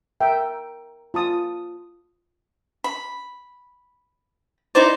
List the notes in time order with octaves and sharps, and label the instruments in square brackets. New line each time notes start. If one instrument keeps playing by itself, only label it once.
[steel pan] A#4 E5 G5
F4 A5 D#6
[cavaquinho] B5
D#4 E4 C5 D5